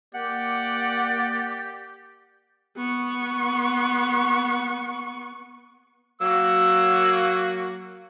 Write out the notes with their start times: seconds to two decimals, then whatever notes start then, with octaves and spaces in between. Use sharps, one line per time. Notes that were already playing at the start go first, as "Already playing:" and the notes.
0.15 A#3 G4 D5 F#5
2.77 B3 C#6
6.21 F#3 A#3 F#4 E6